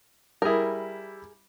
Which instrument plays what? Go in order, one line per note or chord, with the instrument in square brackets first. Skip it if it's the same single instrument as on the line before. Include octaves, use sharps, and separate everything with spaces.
[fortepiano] G3 E4 [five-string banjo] G#4 A#4